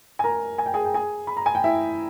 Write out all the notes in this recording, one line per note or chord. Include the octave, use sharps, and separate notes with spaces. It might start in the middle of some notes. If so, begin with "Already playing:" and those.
G#5
A#4 A#5
G#5
G5
G#4 G#5
G5
G#4 G#5
B5
A#5
G#5
G5
E4 E5